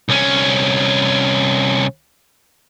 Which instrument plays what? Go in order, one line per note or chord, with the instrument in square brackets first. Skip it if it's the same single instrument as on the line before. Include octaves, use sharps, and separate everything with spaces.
[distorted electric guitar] C2 C#4